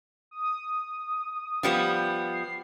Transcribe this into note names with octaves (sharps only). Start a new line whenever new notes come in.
D#6
F3 G3 B3
C7